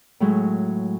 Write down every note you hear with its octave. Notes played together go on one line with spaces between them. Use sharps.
A2 F#3 G#3